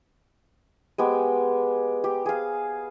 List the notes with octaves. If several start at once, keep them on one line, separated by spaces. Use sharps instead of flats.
G#3 B3 G4
G4
G#4 F5